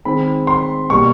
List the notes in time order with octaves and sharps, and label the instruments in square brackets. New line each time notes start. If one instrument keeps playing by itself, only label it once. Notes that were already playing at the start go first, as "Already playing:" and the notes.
[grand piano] D#3 G#3 C4 B5
C6
B2 G3 A#3 C#6